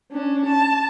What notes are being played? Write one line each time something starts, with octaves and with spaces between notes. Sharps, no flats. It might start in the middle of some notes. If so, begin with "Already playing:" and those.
C#4 D4
A5